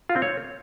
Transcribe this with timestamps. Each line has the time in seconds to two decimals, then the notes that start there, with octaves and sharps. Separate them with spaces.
0.09 F4
0.16 C4
0.22 C#5